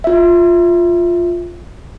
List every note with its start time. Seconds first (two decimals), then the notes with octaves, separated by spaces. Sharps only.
0.04 F4 E5